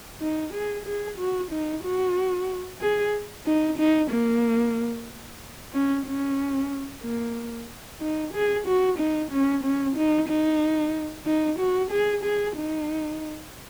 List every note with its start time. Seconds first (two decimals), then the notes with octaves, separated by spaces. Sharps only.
0.21 D#4
0.54 G#4
0.86 G#4
1.18 F#4
1.51 D#4
1.84 F#4
2.81 G#4
3.47 D#4
3.78 D#4
4.11 A#3
5.74 C#4
6.06 C#4
7.04 A#3
8.01 D#4
8.34 G#4
8.66 F#4
8.98 D#4
9.31 C#4
9.64 C#4
9.96 D#4
10.29 D#4
11.26 D#4
11.59 F#4
11.91 G#4
12.24 G#4
12.56 D#4